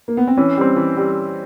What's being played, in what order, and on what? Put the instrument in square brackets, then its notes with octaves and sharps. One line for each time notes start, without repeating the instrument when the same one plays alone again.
[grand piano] A#3
B3
C4
[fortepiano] E3 [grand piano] C#4
[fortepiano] G3 C4
E3
G3